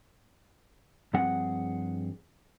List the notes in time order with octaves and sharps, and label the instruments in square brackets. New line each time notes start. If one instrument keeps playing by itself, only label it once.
[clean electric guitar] G2 F3 C4 G#4 F#5